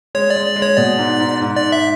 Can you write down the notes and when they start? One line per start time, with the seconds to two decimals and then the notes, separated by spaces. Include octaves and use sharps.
0.15 G#3 C#5
0.30 D5
0.36 G#3
0.46 D5
0.56 G#3
0.62 C#5
0.77 B2 D5
0.99 G#2
1.20 G#2
1.41 G#2
1.56 G#2 D5
1.72 E5